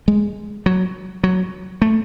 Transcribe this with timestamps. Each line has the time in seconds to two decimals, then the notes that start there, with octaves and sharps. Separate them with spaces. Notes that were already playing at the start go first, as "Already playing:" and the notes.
0.08 G#3
0.66 F#3
1.24 F#3
1.82 A3